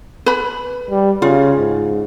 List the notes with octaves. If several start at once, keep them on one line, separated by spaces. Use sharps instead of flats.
B4 B5
G3
C#3 F4
G#2